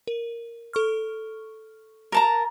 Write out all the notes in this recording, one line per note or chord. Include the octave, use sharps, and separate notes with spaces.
A#4
A4 C#6 F6
A#4 A5 A#5